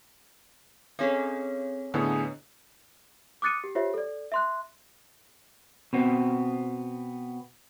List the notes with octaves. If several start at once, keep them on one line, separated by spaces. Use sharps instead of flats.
C4 C#4 D#4 G#4 A4
A2 D3 B3 D#4 G#4
D6 D#6 F#6 A6 C#7 D#7
G4
F4 G4 C5 C#5 E5
A4 D5
E5 C6 F#6
B2 B3 C4